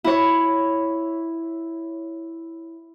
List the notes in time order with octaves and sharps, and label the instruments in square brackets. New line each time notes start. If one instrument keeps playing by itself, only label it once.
[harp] E4 C#5